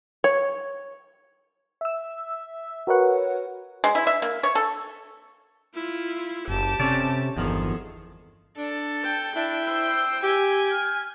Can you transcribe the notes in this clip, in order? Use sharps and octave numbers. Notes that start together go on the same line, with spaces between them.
C#5
E5 E6
F#4 A#4 B4 C#5 F#5
G#3
E4
E5
A#3
C#5
A4
E4 F4
F#1 G4 A5
C3 C#4 A4 D5
G1 E2 D#3 F3 G#4 A4
D4 A4
G5
D4 E4
C5 E6
G4 G#5
F6